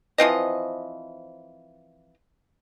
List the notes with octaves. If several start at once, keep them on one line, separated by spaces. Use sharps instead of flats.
E3 F3 C4 D#5